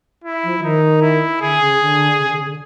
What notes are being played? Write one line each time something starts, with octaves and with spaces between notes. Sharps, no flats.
E4
F3
E3
D#3 D#4
E4
D3 G#4
C#3
D3
C#3
D3
C#3
D3